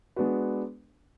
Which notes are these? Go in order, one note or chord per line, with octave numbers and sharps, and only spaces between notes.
G#3 B3 D4 F#4 B4